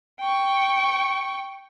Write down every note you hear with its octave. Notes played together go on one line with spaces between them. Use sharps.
G5 C#6